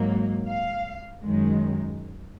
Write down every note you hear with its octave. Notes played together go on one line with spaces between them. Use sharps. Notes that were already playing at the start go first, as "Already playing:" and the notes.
Already playing: G#2 F#3 A#3
F5
F#2 D#3 G#3